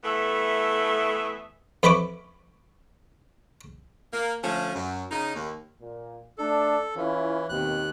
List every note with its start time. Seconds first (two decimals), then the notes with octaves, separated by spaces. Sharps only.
0.04 E3 A3 B3 A4 E5
1.83 F2 E4 B4 B5 C#6 D6
4.13 A#3
4.44 D3 F3 A3 C#4
4.75 F#2
5.11 C#3 D#4
5.36 D#2
5.81 A#2
6.38 A3 D4 A4
6.96 E3 C#4 E4 F4
7.49 D#2 B2 D#3 C4 F#6